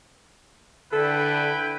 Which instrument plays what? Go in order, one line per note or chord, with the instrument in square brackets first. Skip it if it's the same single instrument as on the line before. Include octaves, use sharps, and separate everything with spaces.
[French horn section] D3 [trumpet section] E4 B4 G5 [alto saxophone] A4